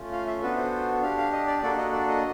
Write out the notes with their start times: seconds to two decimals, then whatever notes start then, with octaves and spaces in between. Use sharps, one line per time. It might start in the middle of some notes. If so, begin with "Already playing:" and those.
Already playing: A3 C#4 F4
0.12 F5
0.27 E5
0.42 B3 D4 F#4 A4 B4
0.57 C5
1.02 D4 G4 F5
1.18 F5
1.32 D#5
1.47 D5
1.62 A#3 D4 F#4 A4 D5
1.78 D#5
1.92 D5
2.08 D#5